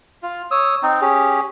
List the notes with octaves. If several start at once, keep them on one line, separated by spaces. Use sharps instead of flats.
F4
C#5 D#6 E6
C4 D#4
C#4 G4 G#4